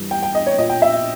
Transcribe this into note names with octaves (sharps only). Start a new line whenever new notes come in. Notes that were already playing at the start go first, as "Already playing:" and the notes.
Already playing: G2 E3
G5
G5
D#5
C#5
A#2 D#5
G5
E5